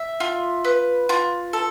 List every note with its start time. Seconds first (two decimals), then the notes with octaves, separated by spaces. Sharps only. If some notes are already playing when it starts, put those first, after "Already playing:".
Already playing: E5
0.20 F4
0.65 B4
1.09 F4
1.53 A4